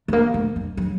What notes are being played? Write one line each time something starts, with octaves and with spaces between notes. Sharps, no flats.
A3
A#3
A3
G3
F#3